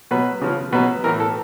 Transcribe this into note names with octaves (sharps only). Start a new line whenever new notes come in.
B2 F#3 B4
C#3 F3
B2 F#3 B4
A2 E3 A#4
A4